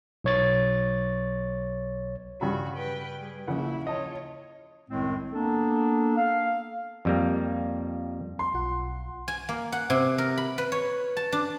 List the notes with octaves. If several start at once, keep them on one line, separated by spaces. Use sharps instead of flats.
B1 C#5 A6
G2 C#3 F#4 B5
B4 G5
G3 G#4
A#1 C#3 A#3 E4 F#5
F4 C#5 D#5 A5
C2 F#2 A2 D#3 G#3 C4
A#3 B3 D4 A4
F5
F2 G3 A#3
C6
B1 F4 F#5
G#5
A#3
F#5
C3
A#4
B5
B4
C#5
A5
D4